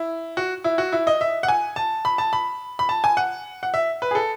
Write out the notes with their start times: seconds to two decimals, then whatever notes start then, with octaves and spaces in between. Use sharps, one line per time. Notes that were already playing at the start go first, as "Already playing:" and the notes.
Already playing: E4
0.37 F#4
0.64 E4
0.78 F#4
0.92 E4
1.07 D#5
1.21 E5
1.43 F#5
1.48 G#5
1.76 A5
2.05 B5
2.18 A5
2.33 B5
2.79 B5
2.89 A5
3.04 G#5
3.17 F#5
3.63 F#5
3.74 E5
4.02 B4
4.11 G#4
4.15 A4